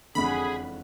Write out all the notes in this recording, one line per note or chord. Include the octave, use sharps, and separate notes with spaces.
E1 F2 D3 C#4 G#4 F#5 B5